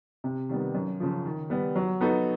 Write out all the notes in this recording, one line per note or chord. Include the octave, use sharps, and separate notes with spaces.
C3
D#3 G3 B3
F#2
C#3 F3
D#3
G3 B3
F#3
B3 D#4 F#4 A4